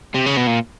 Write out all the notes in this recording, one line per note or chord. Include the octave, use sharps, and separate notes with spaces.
C3
C#3
B2
A#2